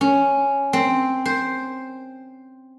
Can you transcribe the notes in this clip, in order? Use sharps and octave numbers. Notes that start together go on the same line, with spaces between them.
C#4
C4
C5